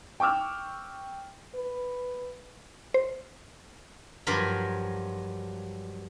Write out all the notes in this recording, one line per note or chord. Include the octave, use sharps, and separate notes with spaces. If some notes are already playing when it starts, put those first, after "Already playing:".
G5 C#6 D6 E6 F6
B4
C5
G2 F3 F#3 F4 A#4 B5